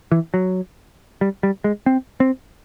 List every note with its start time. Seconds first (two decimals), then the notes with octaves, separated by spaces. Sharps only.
0.12 E3
0.34 F#3
1.21 G3
1.43 G3
1.64 G#3
1.86 C4
2.20 C4